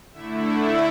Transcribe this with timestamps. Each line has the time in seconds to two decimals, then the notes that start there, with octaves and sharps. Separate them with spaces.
0.13 D3 A3 E4 E5
0.43 E5